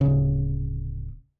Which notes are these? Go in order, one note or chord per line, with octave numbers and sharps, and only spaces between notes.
D1 C#3